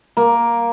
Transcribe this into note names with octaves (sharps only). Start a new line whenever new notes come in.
A#3